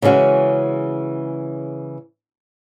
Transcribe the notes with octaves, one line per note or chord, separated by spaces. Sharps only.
C#3 E3 G#3 C#4 F#4